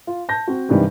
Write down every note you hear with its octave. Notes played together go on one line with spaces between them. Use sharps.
F4
A5 G6 A#6
C4 F#4
G2 C3 D#3 E3 G3